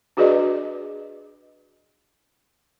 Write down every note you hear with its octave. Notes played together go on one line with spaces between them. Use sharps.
D4 F#4 G#4 B4 D5 D#5